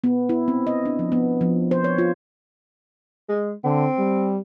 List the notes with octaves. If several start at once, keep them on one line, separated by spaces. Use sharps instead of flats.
B3
E4
C4
D#5
D4
F3
B3
F3
C5
C#5
F4
G#3
D3 C4
G3